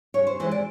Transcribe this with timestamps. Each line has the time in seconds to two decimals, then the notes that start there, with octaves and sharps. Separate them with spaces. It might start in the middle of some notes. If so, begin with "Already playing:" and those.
0.14 G#2 C#5
0.27 C5
0.40 E3 G#3 C5
0.51 D5